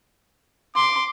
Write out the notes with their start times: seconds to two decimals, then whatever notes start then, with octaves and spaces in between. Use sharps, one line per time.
0.76 C6 D6